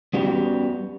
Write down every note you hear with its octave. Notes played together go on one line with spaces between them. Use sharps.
G3 B3 C#4 F#4 G4